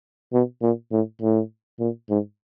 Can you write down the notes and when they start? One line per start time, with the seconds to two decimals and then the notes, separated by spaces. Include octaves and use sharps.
0.33 B2
0.62 A#2
0.92 A2
1.22 A2
1.80 A#2
2.10 G#2